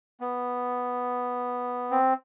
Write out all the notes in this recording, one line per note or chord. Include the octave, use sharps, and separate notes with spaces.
B3
C4